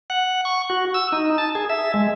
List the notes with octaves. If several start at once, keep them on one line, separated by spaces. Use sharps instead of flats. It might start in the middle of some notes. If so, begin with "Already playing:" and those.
F#5
C#6
F#4
E6
D#4
A5
G#4
E5
G#3